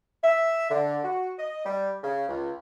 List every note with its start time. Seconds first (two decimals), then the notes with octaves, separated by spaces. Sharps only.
0.23 E5
0.70 D3
1.04 F#4
1.38 D#5
1.65 G3
2.03 C#3
2.28 C#2